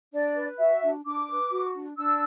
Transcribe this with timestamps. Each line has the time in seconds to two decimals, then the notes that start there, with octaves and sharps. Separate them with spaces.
0.13 D4 D5
0.36 B4
0.58 F#4 E5
0.83 D4
1.04 D4 D6
1.29 B4
1.51 F#4
1.73 D4
1.97 D4 E6